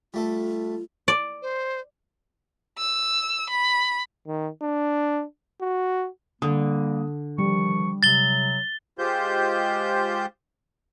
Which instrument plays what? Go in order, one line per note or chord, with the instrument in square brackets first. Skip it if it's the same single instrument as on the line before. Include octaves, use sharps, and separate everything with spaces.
[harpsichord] G3 A3 A4 [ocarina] F4
[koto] D5
[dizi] C5
[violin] E6
B5
[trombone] D#3
D4
F#4
[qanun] D3 [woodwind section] G3 A#3 [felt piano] D#6
[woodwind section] D#3 F3 C#6 [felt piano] G3
[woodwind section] C3 F#3 [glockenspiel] A6 G7
[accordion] G#3 F4 G4 C5 G6